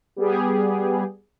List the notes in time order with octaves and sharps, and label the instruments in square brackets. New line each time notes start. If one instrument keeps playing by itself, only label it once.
[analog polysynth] G3 B3 G4 G#4